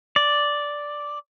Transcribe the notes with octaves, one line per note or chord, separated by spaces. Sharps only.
D5